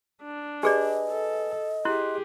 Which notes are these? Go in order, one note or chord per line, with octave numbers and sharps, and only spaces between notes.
D4
G4 G#4 B4 D5 D#5 G#5
A4
E4 G4 G#4 C6 F#6